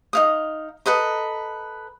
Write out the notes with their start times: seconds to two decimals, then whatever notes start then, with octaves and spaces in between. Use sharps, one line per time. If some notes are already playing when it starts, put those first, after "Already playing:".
0.13 D#4 F5 D#6
0.86 A4 B4 D#5 A#5